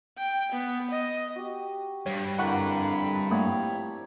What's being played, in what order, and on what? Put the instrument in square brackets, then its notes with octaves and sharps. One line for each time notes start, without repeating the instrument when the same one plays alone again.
[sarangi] G5
B3
D#5
[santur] F#4 G4
[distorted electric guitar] G2 [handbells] C#5
[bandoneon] F2 D3 B5 [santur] A#3 E4 [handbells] F#5 C#6 F#6
[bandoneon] F3 G3 C#5 [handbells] A3 A#3 [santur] C4 G4